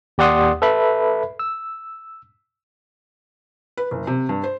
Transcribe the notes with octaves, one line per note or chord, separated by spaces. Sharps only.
D#2 G4 D5 F#5 C6 D#6
A4 B4 E5 B5
E6
B4
F#1
C3
G2
C5